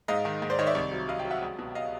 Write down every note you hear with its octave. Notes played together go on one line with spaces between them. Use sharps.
G#2 D#5 F5
D#3
G#2
C5 D5
D#3 C#5 D#5
D5 E5
C2
F#3
C2 D#5 F5
F5 G5
F#3
E5 F#5
C#2
B2
D#5 F5